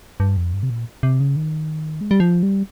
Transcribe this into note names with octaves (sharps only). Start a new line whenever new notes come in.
G2
F2
G2
C3
A#2
C3
C#3
D#3
G#3
G3
F3
G3